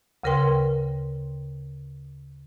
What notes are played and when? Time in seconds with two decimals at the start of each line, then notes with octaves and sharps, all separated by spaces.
0.23 D2 C#3 A#4 B4 G5 C6